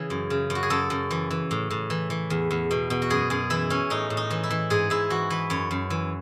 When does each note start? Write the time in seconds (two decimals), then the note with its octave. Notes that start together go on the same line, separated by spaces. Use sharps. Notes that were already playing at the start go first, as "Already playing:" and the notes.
Already playing: C#3 E3 G#4
0.10 F#2
0.30 C#3
0.50 F#2
0.55 F#4
0.63 G#4
0.70 F#2 A4
0.90 F#2
1.11 E3
1.31 E3
1.51 A2
1.70 A2
1.90 E3
2.10 E3
2.30 E2
2.51 E2
2.71 B2
2.90 B2
3.02 F#4
3.10 F#2 G#4
3.30 F#2 G#4
3.50 E3 E4
3.70 E3 C#4
3.90 A2 D#4
4.10 A2
4.17 D#4
4.30 E3
4.43 E4
4.50 E3
4.70 G#2 G#4
4.90 G#2 E4
5.10 E3 F#4
5.30 E3 B4
5.50 F#2 C#5
5.71 F#2
5.90 E3